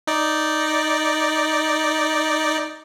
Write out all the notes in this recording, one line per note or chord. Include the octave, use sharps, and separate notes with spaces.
D#4 D5